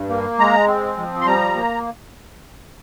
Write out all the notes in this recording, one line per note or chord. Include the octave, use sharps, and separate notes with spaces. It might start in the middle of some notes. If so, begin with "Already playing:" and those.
Already playing: G2
A#3
G#3 A#5
C4
F3
C6
G3 A#5
A#3